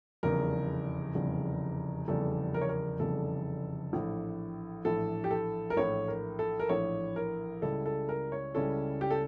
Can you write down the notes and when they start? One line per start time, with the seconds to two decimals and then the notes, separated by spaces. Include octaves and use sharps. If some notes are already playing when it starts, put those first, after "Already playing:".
0.23 F1 E2 C#3 G3 A#4
1.15 F1 E2 C#3 G3
2.08 F1 E2 C#3 G3 A4
2.54 A#4
2.61 C#5
2.69 A#4
3.00 F1 E2 C#3 G3 A4
3.93 A#1 A2 E3
4.85 A#1 A2 E3 A4
5.24 G4
5.31 A4
5.70 A#4
5.77 A#1 A2 E3 C#5
6.08 A#4
6.39 A4
6.60 A#4
6.69 A#1 A2 E3 C#5
7.16 A#4
7.62 C#2 C#3 G3 C#4 E4 A4
7.86 A4
8.09 A#4
8.32 C#5
8.54 C#2 C#3 G3 C#4 E4 A4
9.01 G4
9.11 A4